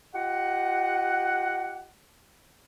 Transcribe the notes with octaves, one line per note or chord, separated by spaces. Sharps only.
F4 G4 D#5 F#5